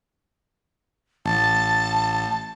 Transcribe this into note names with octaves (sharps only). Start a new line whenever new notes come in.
A1 A5